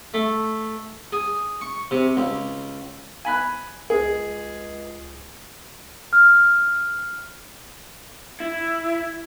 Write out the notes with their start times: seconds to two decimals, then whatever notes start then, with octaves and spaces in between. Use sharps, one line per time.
0.14 A3
1.12 G#4
1.61 C#6
1.91 C3
2.17 C#2
3.25 G#5 B5 F#6
3.90 C#2 G#4
6.13 F6
8.40 E4